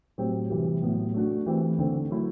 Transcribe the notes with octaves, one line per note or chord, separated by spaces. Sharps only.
A2 F#3 C4 G4
C3 E3 G3
A2 F#3 B3
A3 D4 F#4
E3 A3 C4 G4
D3 A3 C4
F#3 A3 E4